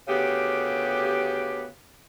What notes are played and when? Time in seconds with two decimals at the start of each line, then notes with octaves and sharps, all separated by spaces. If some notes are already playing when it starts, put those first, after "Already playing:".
0.08 D2 C#3 B3 G4